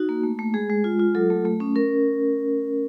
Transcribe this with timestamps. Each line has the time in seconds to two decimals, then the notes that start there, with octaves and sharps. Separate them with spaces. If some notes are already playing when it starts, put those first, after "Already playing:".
Already playing: D#4 F#4
0.09 A#3
0.23 A3
0.39 A3
0.54 G#3 G#4
0.70 G#3
0.84 F4
0.99 F4
1.15 F#3 A4
1.30 A3
1.45 A3
1.60 C#4
1.76 C#4 A#4